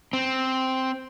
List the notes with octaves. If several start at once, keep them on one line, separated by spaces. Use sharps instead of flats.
C4